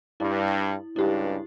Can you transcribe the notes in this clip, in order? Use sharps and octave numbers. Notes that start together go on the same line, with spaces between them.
G2 E4
C#2 G2 E4 G4